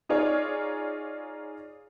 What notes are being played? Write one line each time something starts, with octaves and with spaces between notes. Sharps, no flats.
D#4 F4 G#4 C#5 D5